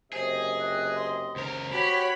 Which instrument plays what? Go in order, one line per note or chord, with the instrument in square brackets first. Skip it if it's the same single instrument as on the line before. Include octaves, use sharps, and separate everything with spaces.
[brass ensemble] F#1 C3 D#5 [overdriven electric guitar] G#4 [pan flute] C5
[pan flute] F#6
C6
[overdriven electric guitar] C#2 A#4 [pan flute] C5
[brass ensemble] F#4 [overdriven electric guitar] G4 [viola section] C#5 B5